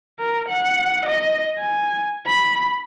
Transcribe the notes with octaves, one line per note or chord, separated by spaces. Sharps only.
A#4
F#5
D#5
G#5
B5